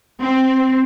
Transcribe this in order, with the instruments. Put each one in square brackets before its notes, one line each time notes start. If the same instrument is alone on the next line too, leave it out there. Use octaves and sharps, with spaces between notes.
[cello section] C4